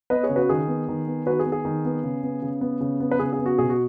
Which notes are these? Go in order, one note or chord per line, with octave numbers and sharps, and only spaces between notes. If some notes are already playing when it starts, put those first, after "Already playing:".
B3 B4 D#5
G#4 C#5
C#3
F#4 B4
D#3 G#4
B3
D#3
B3
D#3 F#4 B4
G#4
B3
G#4
D#3
B3
C#3
B3
C#3
B3
C#3
B3
B4
C#3 G#4
G#4
B3
F#4
B2 G#4
F#4